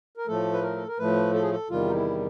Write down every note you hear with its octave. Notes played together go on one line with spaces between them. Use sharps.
A#4
A2 F3 A3 A4
B4
A#4
A4
A#4
A2 F3 A3 B4
A4
G#4
A4
E2 C3 D#3 G3 F4
D#4
E4